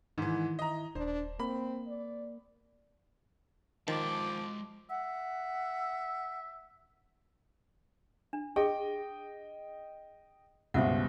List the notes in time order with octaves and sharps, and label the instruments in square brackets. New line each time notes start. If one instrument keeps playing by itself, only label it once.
[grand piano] G#2 E3 [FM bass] D#3
[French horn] E4 [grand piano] D#5 A#5
[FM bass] D#1 [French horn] D4 [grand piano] C5
[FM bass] A#3 [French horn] C4 [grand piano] B5
[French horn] D5
[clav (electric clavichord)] D#3 [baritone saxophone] F3 [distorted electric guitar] G#3 A5 [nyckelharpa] D6
[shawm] E5 [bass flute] F#5
[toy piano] D4
[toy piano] G4 G#4 [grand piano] D#5 G5
[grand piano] C#2 G2 B2 [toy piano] C5 E5 F#5